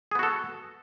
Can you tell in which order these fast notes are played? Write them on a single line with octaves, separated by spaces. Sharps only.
G#4 B3 F#4 A4